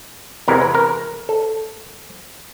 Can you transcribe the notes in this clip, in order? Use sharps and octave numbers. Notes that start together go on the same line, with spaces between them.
E2 C3 E3 G#3 A#4
B4
A#4
A4